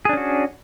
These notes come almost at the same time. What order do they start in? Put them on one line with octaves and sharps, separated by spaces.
G#4 D4 C#4 F#4